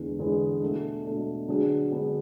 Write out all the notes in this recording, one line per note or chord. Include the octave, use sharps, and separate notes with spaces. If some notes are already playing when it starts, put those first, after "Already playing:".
Already playing: E2 D3 G#3 B3
E2 D3 G#3 B3
B2 A3 D4
B2 A3 D4
D3 F#3 B3 D4 G#4
D3 F#3 B3 D4 G#4